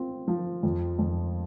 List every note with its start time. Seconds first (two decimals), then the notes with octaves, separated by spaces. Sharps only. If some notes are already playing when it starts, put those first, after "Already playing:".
Already playing: C4 F4
0.28 F3
0.63 F2
0.99 F2